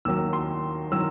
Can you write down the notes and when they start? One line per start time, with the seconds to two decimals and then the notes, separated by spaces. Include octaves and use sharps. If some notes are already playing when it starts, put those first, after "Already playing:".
0.05 D#2 D#3 F#3 E6
0.33 C6
0.92 D#3 F#3 E6